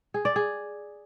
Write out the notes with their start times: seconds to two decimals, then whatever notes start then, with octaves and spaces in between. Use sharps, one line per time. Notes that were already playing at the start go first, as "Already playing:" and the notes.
0.14 G#4
0.25 D5
0.36 G#4